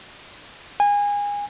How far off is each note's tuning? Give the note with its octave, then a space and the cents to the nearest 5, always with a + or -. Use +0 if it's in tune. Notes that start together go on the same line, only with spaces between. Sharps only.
G#5 -25